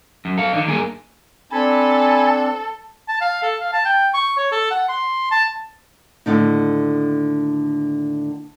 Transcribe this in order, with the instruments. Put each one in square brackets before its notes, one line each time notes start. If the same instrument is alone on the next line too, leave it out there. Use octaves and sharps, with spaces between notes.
[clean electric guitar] F#2
A4 F5
D3 D#3
G2 A#3 G#4 A#4 G#5
[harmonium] C4 D4 [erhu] A4 [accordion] G#5 B5
[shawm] A5
F5
A4
F5
A5
G5
C#6
C#5
A4
F#5
C6
A5
[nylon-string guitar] D#2 A2 D3 D#4